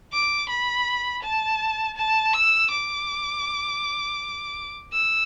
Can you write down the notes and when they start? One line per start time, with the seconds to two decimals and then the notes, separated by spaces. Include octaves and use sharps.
0.13 D6
0.49 B5
1.23 A5
1.97 A5
2.34 E6
2.71 D6
4.93 E6